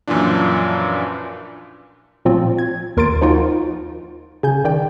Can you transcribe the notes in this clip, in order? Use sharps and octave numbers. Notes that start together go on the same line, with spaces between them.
F#2 A#2 E3 F3 D4
A#2 F3 C4 F4
G#6
D#2 A#4 C6 A6 D7
F3 D#4 F4 F#4
C#3 G#5 G6
D#3 D5 G5